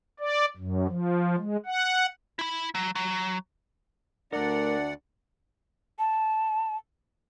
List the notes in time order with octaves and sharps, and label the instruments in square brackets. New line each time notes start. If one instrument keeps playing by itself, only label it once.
[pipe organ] D5
F#2
F3
G#3
F#5
[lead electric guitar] E4 B5
F#3
F#3
[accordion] D2 D5 F#5 [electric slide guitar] A3 A#4 [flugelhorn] D4
[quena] A5